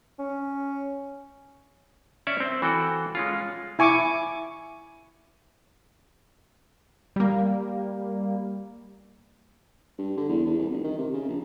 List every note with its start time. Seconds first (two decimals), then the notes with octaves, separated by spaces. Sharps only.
0.19 C#4
2.27 C#4 C#5 D5 E5
2.40 C4
2.62 E3 F#4 A4 G5
3.15 G#3 C#4 F4
3.79 E4 G#5 C#6 D6
7.16 G3 A#3
9.98 G2
10.17 D3
10.29 E2
10.47 E2
10.59 C2
10.72 F1
10.84 D#3
10.98 C3
11.13 C#3
11.29 A#1